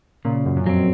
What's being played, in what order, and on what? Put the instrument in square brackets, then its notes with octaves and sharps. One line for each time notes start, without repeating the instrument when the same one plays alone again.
[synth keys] A#2 [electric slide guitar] C#3
[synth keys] F#2
F#2
[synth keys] F2 [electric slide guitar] F#3 C4